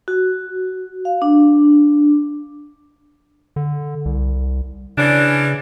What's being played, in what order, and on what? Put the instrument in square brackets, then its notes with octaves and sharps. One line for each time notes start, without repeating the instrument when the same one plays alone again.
[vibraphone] F#4
F5
D4
[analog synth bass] D3
C2
[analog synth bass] C#3 [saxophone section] E3 C#4 D4